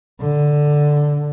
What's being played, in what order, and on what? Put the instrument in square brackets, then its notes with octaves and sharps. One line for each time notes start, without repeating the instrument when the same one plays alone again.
[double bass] D3